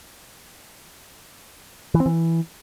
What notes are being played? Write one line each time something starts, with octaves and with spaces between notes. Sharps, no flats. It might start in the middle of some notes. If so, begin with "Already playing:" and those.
E3
C4
E3